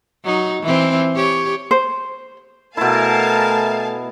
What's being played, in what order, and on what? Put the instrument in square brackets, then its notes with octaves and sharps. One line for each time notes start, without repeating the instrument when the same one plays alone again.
[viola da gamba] F#3 D#4
E3 C4
G4 C#5
[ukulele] C5
[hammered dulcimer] B2 E4 [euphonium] A3 [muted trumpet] A#4 [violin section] F5 G#5 A5